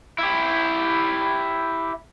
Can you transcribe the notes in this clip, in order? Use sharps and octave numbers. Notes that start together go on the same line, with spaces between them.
E4 G4